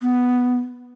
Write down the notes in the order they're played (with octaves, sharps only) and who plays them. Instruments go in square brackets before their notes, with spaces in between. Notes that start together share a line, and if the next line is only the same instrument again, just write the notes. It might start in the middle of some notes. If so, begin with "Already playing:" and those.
[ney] B3